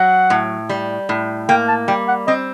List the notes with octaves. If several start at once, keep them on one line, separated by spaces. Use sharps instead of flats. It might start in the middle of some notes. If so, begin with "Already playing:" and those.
Already playing: F#3 F#5
A2
G3
A2
A#3 G5
A5
G3 G5
F#5
C4 D#5